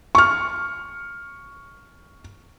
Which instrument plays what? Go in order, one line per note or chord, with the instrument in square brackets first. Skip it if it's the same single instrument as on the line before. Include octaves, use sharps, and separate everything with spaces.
[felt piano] C#6 F6